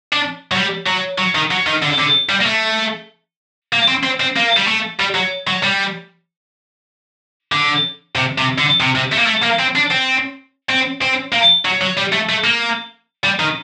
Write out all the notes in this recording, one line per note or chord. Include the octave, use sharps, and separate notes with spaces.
D4
F#3
G3
F#3
F#3
D#3
F#3
D#3
D3
D3
G3
A#3
A3
A#3
C4
C4
C4
A#3
G3
A3
G3
F#3
F#3
G3
D3
C3
C3
D3
C3
C3
A3
A#3
A3
A#3
C4
D4
C4
C4
C4
A#3
F#3
F#3
G3
A3
A3
A#3
G3
D#3